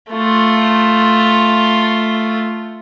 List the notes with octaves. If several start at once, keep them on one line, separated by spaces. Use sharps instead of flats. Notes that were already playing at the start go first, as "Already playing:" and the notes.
A3 F4